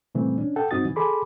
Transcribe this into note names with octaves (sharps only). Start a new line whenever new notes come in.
A#2 C#3 E3 G3 A3 C4
C#4 D4
A4 F#5 G5
G2 C4 D#4 F#4 D#6 A6
C#3 E3
G#4 A4 B5 C6 D6